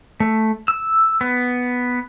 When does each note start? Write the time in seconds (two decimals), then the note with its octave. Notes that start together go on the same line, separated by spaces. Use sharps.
0.20 A3
0.68 E6
1.21 B3